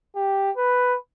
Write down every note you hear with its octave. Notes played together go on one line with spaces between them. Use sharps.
G4
B4